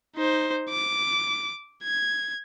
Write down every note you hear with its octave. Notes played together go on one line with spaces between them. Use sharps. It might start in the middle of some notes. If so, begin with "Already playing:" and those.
D#4 C5
D6
G#6